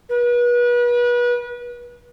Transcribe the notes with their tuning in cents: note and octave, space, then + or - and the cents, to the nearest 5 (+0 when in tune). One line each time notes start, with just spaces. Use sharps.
B4 -35